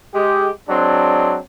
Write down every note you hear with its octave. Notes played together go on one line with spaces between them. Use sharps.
G#3 G4
F#3 G#3 C4 D4